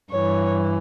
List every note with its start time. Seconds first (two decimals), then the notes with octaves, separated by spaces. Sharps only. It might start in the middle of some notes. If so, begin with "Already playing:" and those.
0.12 G2 E3 C#5